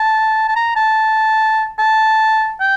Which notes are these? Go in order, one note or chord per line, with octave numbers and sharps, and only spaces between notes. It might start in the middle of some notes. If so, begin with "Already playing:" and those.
Already playing: A5
A5
A#5
A5
A5
G5